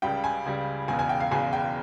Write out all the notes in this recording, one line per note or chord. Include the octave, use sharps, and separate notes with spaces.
C#2 C#3 G3 G5
G#5
C#2 C#3 G3
E1 E2 C#3 G#5
G#5
G5
F5
E1 E2 C#3 G#5
G5